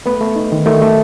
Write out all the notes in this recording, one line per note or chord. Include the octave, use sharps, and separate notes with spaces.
A3 B3 B4
A3
D#4
D#3
D#3 A3 A4
A3